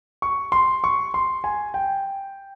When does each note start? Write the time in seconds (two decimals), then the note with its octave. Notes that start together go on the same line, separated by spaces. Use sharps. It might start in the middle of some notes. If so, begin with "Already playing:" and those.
0.22 C#6
0.52 C6
0.84 C#6
1.14 C6
1.44 G#5
1.74 G5